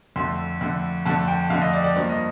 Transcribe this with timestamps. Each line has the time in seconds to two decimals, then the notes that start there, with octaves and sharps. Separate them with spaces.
0.16 F2 D3 A3 C6
0.61 F2 D3 A3
1.05 F2 D3 A3 A5
1.28 G5
1.50 F2 D3 A3 F5
1.62 D#5
1.73 D5
1.84 D5
1.96 G2 F3 A#3
2.09 D#5